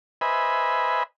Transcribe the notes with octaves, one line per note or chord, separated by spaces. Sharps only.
B4 C5 D#5 E5 G#5 B5